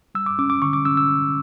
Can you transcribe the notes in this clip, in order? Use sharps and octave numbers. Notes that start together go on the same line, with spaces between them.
G3 E6
D6
C#4 D6
D6
D3 C#6
D6
C#4 E6
E6
C#4